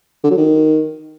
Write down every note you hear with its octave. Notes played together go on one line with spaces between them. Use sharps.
D3
F#3
D#3